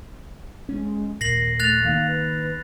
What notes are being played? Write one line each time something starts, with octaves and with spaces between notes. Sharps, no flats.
G#3 C#4
D#2 A#2 A#4 A#6 C7 F#7
A3 F#6 A6 F7
D#3 A#3 F5
B4